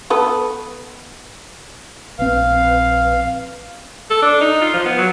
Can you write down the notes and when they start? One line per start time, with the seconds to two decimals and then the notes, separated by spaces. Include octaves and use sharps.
0.10 B3 A4 B4
2.19 A#1 C4 B4 F5
4.10 A4
4.22 D4
4.41 D#4
4.61 F4
4.74 F3
4.86 B3
4.98 F#3